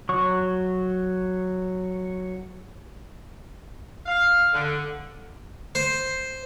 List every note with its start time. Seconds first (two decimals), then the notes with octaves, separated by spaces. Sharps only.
0.09 F#3 C#6
4.06 F5
4.53 D3
5.75 C5